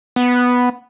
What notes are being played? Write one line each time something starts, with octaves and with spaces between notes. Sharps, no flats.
B3